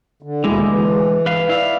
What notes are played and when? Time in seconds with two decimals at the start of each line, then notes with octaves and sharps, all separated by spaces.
0.22 D3
0.44 D#2 B2 D3 G#3 E4
0.68 E3
1.26 B4 F5
1.49 E4 D5 E5 F5